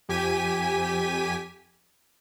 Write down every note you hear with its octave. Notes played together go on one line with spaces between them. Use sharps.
F2 G4 G#5 B6 D#7